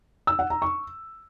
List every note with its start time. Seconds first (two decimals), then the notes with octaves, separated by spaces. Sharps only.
0.27 E6
0.39 F#5
0.50 A#5
0.62 C#6